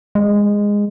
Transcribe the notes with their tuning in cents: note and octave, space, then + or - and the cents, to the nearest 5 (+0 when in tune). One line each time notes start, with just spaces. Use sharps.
G#3 -15